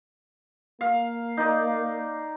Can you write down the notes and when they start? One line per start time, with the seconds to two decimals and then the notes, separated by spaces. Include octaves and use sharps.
0.81 A#3 F5
1.37 D#4 D5